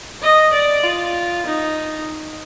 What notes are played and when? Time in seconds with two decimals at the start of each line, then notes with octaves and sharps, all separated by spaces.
0.22 D#5
0.53 D5
0.83 F4
1.46 D#4